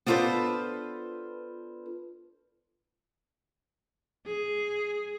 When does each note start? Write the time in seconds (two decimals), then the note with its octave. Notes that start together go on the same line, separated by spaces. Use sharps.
0.06 B3 D4 F4 A4 B4 C5
4.26 G#4